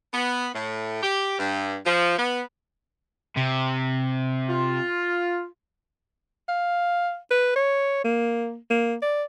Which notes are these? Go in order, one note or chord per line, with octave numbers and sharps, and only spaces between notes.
B3
A2
G4
G2
F3
B3
C3
F4
F5
B4
C#5
A#3
A#3
D5